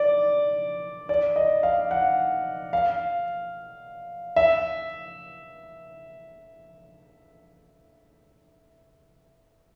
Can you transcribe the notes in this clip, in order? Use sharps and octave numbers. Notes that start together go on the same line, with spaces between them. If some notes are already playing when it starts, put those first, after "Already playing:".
Already playing: D5
D5
D#5
F5
F#5
F5
E5